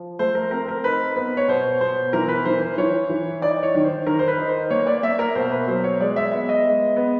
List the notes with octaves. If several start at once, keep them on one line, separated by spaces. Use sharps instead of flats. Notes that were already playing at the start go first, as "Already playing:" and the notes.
Already playing: F3
A3 C5
A#4
C4 A#4
A#4
D#4 B4
B3 B4
C#5
B2 C5
B2 C5
E3 A#4
B4
E3 C5
C5
E3 C#5
E3
D#4 D5
C#5
D#3
C5
D#3 A#4
C5
B4
D#4
C5
A#3 C#5
D5
A#3 E5
A#4
B2 C5
B4
F#3 C5
C#5
G#3 D5
E5
B3 E5
D#5
G#3
B3